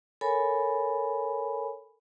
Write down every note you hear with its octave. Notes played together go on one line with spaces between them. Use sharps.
A4 A#4 C#5 G#5 B5